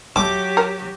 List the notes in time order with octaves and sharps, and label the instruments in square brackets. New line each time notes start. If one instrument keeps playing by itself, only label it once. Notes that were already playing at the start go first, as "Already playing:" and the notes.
[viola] F#3 G4 [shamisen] A3 [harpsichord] D6
[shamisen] A#4